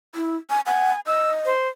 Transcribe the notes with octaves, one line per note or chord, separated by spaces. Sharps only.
E4
G#5
F#5 G#5
D#5 E6
C5